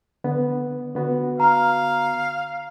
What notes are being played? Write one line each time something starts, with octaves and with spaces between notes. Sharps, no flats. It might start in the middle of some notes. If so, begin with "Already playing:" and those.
D3 B3
D3 B3 F#4
F5 A#5 F6